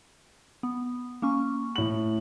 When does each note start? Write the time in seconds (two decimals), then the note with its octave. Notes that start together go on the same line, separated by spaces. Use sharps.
0.63 B3
1.22 A#3 C#4 C#6
1.76 A2 F#7